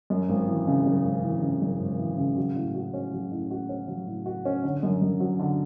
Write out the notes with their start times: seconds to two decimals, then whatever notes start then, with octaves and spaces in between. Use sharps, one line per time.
0.10 F#2
0.29 G#1
0.48 E3
0.67 C#3
0.86 F#2
1.04 G#1
1.24 E3
1.42 C#3
1.62 F#2
1.80 G#1
1.99 E3
2.18 C#3
2.37 F#3
2.56 A2
2.75 F#4
2.93 C#4
3.12 F#3
3.32 A2
3.51 F#4
3.69 C#4
3.88 F#3
4.07 A2
4.26 F#4
4.45 C#4
4.64 D3
4.83 F#2
5.02 F#2
5.20 F#3
5.40 D3